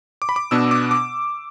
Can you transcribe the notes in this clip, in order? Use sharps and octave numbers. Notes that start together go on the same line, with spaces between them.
D6
B5
D6
B2 B3 D4 E6
D6
D6